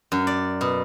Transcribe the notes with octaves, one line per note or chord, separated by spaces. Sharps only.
F#2
D5
B2